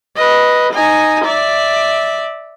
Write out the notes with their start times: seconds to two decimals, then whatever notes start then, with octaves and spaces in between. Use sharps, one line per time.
0.16 B4 D#5
0.74 D#4 G#5
1.25 D5 E5